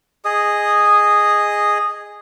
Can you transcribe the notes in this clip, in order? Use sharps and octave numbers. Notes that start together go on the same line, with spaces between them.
G#4 D#5 D#6